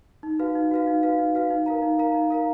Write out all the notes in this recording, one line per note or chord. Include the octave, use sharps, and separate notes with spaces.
D#4
F#4 B4 F5
D#4
F#4 B4 F5
D#4
F#4 B4 F5
D#4
F#4 B4 F5
D#4
A#4 F5 A#5
D#4
A#4 F5 A#5
D#4
A#4 F5 A#5